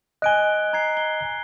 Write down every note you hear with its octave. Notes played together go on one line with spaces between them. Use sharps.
D#5 G#5 F#6 D7 G7
A#5 G#6 C7
G7